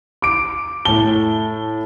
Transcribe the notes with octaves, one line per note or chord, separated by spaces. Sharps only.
D6 D7
A2 A5 G7